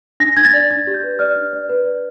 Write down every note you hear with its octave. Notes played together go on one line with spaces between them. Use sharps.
D4 A#6
D4 G#6
A6
D5
D4 A6
G4
G6
B4
D5 F6
D4
D5
B4
D5